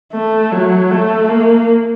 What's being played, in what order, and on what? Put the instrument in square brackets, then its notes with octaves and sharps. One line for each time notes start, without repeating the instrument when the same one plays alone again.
[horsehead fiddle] A3
F#3
A3
A#3